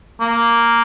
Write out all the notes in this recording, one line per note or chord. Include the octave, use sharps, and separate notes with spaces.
A#3